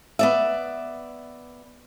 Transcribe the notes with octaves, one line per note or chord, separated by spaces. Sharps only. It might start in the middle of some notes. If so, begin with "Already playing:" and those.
B3 D5 E5